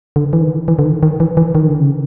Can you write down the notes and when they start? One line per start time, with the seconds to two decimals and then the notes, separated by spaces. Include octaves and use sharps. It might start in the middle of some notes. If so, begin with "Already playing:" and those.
0.16 D3
0.33 E3
0.42 D#3
0.68 E3
0.79 D3
0.85 D#3
1.03 D#3
1.20 E3
1.37 E3
1.55 D#3
1.67 D3
1.80 C#3